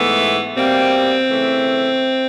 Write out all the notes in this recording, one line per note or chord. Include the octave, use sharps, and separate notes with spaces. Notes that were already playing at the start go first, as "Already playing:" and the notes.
Already playing: G#2 E3 A3 B3
B2 G3 A#3 C4
C#3 E3 A3